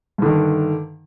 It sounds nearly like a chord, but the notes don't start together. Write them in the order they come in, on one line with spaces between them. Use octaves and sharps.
G2 D3 D#3